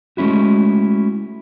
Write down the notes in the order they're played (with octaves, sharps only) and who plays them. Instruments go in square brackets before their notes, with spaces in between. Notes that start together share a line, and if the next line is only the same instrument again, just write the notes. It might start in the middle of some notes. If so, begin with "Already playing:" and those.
[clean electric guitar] G#3 A3 C#4 E4 F#4